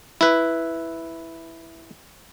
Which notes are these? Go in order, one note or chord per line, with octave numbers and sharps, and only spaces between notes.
E4 B4